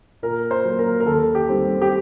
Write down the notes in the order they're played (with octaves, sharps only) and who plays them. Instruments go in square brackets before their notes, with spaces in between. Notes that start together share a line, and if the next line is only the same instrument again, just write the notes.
[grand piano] A#2 A#4
C5
F#3 A#3
A#4
A#4
D#2 A4
G4
D#3 G3 C4
G4